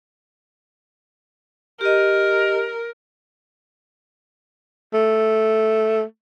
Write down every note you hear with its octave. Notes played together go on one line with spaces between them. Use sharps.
G4 A#4 D#5
A3